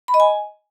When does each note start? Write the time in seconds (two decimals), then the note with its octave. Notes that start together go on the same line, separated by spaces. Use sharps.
0.08 B5
0.14 D#5
0.20 G#5